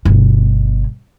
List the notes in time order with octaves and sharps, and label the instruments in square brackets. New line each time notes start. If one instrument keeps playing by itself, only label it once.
[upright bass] G1 B2